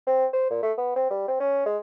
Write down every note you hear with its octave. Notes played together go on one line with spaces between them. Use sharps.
C4
C5
A#2
A3
B3
C4
G3
C4
C#4
G#3